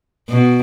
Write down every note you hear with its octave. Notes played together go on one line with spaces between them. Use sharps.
B2